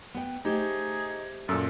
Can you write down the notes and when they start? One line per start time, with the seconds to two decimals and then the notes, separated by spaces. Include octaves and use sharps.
0.14 B3 F#5 G5
0.45 A3 D#4 G4 G#4 C5
1.49 F#2 A#2 A4